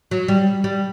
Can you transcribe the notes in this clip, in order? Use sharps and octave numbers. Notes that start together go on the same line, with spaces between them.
F#3
G3
G3